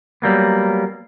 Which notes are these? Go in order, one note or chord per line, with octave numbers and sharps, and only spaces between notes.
F#3 G3 A#3 B3